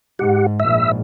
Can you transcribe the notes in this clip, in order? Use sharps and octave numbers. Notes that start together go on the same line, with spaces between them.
G#2 G4 F#5
A#1 G#2 E5 E6